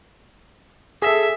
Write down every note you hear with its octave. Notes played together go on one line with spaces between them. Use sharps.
G#4 A4 E5